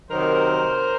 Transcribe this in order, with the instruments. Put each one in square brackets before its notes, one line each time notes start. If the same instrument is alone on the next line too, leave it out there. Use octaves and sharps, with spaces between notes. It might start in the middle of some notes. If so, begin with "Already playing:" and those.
[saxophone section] C3 D#3 F#3 A#4 C5